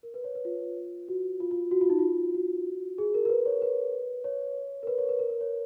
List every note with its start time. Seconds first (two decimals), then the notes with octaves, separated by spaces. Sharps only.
0.03 A#4
0.14 B4
0.24 C#5
0.35 B4
0.45 F4
1.08 F#4
1.40 F4
1.51 F4
1.71 F#4
1.81 F4
1.90 D#4
1.99 F4
2.34 F#4
2.98 G#4
3.14 A#4
3.25 A#4
3.30 B4
3.46 C#5
3.62 B4
4.24 C#5
4.83 A#4
4.87 B4
4.98 C#5
5.09 B4
5.19 A#4
5.29 A#4
5.41 C#5